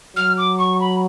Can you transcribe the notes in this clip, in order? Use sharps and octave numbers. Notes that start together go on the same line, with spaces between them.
F#3 F6
D6
C#6
B5